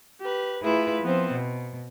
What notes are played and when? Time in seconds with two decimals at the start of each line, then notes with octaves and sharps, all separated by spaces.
0.21 G4 B4
0.63 A3 E4 F4 G#4 B4 E5
1.02 F3 B3 C4 C5
1.31 B2